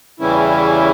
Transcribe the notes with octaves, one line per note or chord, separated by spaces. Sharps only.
E2 C#3 E3 G3 C#4 E4